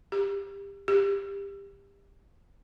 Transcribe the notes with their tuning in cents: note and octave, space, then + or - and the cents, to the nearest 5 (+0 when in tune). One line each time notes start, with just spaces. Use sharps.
G4 +20
G4 +20